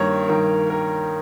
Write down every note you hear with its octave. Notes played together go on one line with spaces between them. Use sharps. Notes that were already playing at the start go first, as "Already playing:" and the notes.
Already playing: G2 D#3 A#3 A#4 C#5
G2 D#3 A#3 A#4
A#4